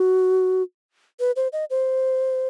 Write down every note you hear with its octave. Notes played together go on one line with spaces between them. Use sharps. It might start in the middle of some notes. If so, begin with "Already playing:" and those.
Already playing: F#4
B4
C5
D#5
C5